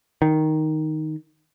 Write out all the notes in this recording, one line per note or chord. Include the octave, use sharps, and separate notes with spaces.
D#3